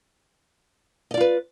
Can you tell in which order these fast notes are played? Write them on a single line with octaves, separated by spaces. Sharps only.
D#5 D5 F4 B4